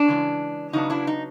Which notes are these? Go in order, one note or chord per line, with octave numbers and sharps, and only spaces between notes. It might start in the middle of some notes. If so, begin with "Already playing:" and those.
Already playing: D4
C#3 E3 G#3
C#3 F#3 B3 D4 D#4
D4 E4
D#4